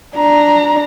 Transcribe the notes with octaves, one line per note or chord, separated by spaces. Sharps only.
D4 A#5